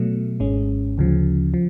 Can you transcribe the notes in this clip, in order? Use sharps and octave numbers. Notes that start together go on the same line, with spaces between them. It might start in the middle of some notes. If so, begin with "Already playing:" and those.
Already playing: B2 F#3 A3
G#1 G#2 G#3 C#4
D2 C#3 F3
F3